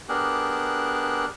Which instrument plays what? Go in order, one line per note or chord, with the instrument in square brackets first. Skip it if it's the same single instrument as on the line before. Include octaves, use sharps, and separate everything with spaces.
[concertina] B3 D4 G4 G#4 A#4 F#6